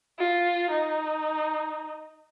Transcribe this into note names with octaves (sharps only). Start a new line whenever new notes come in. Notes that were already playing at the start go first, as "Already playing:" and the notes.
F4
D#4